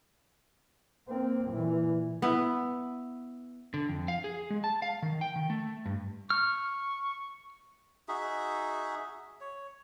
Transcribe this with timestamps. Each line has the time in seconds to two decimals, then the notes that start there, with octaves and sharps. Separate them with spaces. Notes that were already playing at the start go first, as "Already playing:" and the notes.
1.08 A#3 C4
1.48 A#2 E3
2.22 B3 E4
3.74 D3
3.89 F2
4.08 F5
4.24 G#4
4.50 G#3
4.64 A5
4.82 F5
5.02 D#3
5.21 G5
5.36 D#3
5.50 A3
5.86 G2
6.30 C#6 F6
8.08 D#4 F#4 G#4 E5
9.41 C#5